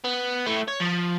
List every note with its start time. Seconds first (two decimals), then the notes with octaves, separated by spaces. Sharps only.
0.04 B3
0.46 A3 E4
0.68 C#5
0.80 F3